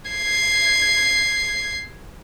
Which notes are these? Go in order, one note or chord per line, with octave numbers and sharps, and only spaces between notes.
G#6 C7